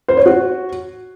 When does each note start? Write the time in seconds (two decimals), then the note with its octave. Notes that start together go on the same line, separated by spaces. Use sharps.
0.08 C5
0.17 C#5
0.26 F#4